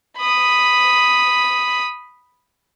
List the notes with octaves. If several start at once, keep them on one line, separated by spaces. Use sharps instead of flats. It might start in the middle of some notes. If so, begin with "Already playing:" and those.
B5 D#6